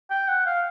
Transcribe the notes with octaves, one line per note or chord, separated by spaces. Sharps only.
G5
F#5
F5